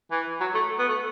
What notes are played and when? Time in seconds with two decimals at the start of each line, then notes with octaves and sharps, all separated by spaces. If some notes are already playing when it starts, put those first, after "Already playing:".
0.11 E3
0.41 F#3
0.54 A3
0.79 B3
0.89 A3